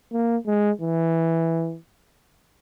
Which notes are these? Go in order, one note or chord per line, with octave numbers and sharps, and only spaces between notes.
A#3
G#3
E3